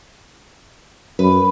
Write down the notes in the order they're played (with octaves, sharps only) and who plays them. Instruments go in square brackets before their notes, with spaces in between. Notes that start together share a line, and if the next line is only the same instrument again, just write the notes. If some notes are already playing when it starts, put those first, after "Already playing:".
[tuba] F#2 [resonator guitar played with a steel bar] B4